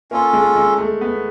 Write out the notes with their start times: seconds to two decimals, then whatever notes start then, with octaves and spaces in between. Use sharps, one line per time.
0.11 A#3 C#4 F4 A4
0.33 G#3
0.56 G#3
0.78 A3
1.01 B3